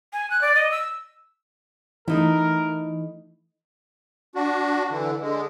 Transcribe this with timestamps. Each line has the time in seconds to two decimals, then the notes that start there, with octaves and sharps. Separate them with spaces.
0.13 G#5
0.30 F#6
0.41 D5
0.55 D#5
0.71 E6
2.08 E3 A3 D#4 E4 A#4
4.35 D4 F#4
4.90 D3 E3
5.21 D3 G#3